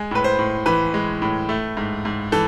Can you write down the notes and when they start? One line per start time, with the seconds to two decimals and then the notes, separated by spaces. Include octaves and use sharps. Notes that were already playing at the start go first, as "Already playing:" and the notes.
Already playing: G#3 G#5
0.11 A2 B4
0.24 C5
0.39 A2
0.66 E3 B4
0.94 G#3
1.22 A2
1.49 A3
1.77 G#2
2.05 G#2
2.32 E3 A4